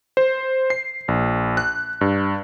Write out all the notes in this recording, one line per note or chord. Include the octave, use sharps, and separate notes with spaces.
C5
C7
A#1
F#6
G2